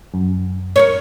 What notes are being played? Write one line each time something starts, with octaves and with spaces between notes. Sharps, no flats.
F#2
A#4 C5 C#5